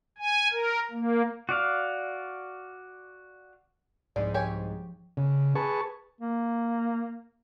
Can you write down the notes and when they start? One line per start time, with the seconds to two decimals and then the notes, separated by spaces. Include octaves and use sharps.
0.18 G#5
0.51 A#4
0.91 A#3
1.49 F#4 D5 F5
4.16 C2 G#2 F3 D5
4.34 G4 C#5 G#5
5.17 C#3
5.55 G#4 B4 A5 C#6
6.21 A#3